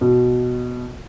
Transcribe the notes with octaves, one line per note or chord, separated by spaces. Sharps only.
B2